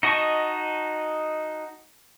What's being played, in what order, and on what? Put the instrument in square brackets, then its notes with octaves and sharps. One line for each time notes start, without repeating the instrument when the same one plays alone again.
[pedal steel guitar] D#4 F#4 D#5 A5 C#6